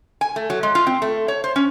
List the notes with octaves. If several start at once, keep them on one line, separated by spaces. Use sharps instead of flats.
G#5
A3
F#3
G#3
F4
C4
A3
C#5
C5
C#4